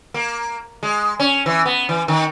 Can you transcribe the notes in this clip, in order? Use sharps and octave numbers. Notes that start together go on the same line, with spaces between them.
A#3
G#3
C#4
E3
B3
E3
D#3